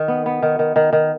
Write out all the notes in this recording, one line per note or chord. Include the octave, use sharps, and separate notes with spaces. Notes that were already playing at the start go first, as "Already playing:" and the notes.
Already playing: D#3
B3
B3
D#3
D#3
D#3
D#3